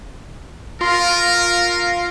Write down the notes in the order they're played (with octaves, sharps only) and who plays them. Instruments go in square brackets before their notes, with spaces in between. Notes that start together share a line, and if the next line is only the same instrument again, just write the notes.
[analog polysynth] F4 [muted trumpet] A#4